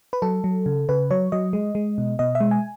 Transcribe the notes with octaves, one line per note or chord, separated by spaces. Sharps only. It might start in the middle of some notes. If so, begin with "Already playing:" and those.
B4
F#3 A4
F#3
C#3
C#3 B4
F#3 C#5
F#3 D#5
G#3
G#3
B2
B2 D#5
E5
G#3
G#5